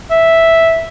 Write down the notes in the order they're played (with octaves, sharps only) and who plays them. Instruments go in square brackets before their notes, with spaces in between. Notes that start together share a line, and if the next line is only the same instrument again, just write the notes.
[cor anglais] E5